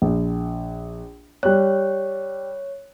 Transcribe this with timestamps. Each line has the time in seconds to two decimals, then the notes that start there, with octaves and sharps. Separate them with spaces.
0.02 A#1
1.43 G3 C#5 F#6